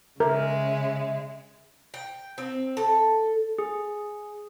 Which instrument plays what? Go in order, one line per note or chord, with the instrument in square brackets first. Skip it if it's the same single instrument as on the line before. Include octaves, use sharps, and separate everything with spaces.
[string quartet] C#3 G#3 [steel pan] A#4 [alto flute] E5
[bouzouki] G5
C4
A4
[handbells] G#4